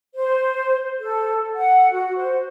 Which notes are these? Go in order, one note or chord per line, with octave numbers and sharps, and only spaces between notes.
C5
A4
F#5
F#4
C5